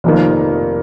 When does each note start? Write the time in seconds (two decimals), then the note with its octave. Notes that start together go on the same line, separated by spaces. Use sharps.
0.04 F1 F2 D#3 A#3